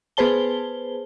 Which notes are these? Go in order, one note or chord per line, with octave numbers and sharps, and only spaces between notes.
B3 G#4 B4 C5 A5 G7